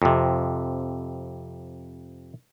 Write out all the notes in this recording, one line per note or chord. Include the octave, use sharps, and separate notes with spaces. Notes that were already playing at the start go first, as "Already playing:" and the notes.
F2 C3